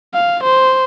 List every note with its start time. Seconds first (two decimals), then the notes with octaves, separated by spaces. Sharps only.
0.14 F5
0.44 C5